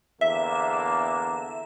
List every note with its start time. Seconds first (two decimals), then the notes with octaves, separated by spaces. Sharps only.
0.21 E2 D3 A#3 E5